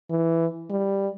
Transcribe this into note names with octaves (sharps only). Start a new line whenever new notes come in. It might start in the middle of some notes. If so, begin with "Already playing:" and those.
E3
G3